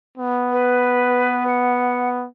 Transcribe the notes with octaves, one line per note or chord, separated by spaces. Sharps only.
B3
B4
F#5